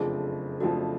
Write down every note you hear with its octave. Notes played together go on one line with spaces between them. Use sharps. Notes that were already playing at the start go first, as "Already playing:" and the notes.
Already playing: F#1 F2 F3 A3 D4 G#4
F#1 F2 F3 A3 D4 F#4